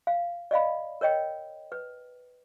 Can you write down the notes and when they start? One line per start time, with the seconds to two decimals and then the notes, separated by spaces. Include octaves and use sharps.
0.07 F5
0.51 D5 D#5 F5 B5
1.01 A#4 C#5 D#5 G5
1.72 B4